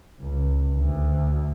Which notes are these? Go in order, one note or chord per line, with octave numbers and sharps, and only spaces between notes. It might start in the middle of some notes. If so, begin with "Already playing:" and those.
C#2
D2